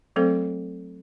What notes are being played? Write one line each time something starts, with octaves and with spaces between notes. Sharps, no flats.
F#3 A3 C4 A4 C5